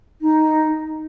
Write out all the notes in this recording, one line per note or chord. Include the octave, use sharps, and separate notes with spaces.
D#4